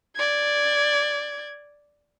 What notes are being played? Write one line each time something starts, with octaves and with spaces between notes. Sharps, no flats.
D5 G#6